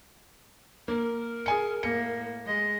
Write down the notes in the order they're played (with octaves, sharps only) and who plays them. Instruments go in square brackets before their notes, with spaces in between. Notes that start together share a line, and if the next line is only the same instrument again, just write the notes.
[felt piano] A#3 [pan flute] A#4
[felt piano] G#4 G#5 C#7
[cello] A2 A#3 [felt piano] C#7
[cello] G#3 D#5